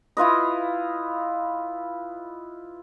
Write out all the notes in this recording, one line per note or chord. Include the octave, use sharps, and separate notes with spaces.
E4 F4 B4 D#5